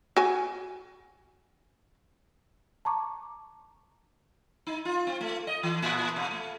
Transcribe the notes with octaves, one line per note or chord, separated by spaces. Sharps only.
F#4 G#5
A5 A#5 C#6 D6
D#4
F4
C4
A3
D#5
E3
A#2
B2
A3